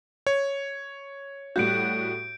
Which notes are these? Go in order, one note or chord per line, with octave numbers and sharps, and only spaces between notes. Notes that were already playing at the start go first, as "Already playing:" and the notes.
C#5
A2 G3 F#4 G6 D7